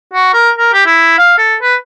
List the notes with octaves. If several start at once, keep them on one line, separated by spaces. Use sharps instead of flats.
F#4
A#4
A#4
G4
E4
F5
A4
B4